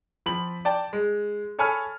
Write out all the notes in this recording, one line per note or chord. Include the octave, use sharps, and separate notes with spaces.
F3 C4 B5 F#7
D5 G5 A5
G#3
A4 C#5 G#5 A5 B5 F6